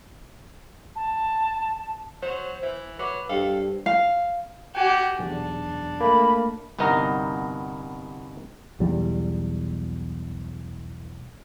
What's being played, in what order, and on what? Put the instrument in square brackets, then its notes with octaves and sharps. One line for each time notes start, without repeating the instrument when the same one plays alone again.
[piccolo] A5
[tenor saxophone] F#3 [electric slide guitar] C5
[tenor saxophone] E3
[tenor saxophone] F#3 [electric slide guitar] B4 [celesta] D6
[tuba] G2 [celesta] G4 C5 [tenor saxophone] A4 [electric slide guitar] F5 G5
[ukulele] F5
[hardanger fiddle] F#4 G4 [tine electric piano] G5 G#5
[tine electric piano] B1 E2 [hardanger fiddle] D4
[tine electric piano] A3 A#3 [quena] B5
[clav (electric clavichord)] G1 C2 B3 D#4 A#4 A#5
[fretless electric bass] B1 E2 G3